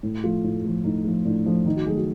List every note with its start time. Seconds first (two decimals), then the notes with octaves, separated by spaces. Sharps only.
0.03 A2
0.23 F3 A3 F4
0.44 A2
0.64 F3 A3
0.84 A2 D#4
1.04 F3 A3
1.25 A2 D4
1.46 F3 A3 D4
1.66 D#3 D#4
1.76 F#4
1.86 F#3 A3 G#4
1.97 F#4